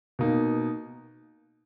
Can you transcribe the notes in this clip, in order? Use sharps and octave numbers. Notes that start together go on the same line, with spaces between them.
B2 A#3 D#4